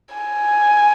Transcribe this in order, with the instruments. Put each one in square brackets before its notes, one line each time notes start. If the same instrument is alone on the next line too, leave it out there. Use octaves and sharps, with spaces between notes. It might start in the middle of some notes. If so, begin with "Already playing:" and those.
[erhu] G#5